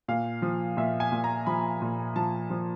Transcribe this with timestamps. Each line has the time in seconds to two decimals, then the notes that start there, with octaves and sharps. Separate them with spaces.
0.08 A#2 F5
0.42 F3
0.77 A#2 E5
1.00 G#5
1.12 A#2
1.24 A#5
1.46 F3 B5
1.82 A#2
2.16 F3 A5
2.50 F3